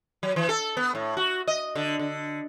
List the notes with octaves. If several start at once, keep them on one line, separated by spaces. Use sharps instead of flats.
F#3
E3
A4
B3
A2
F#4
D#5
D3
D3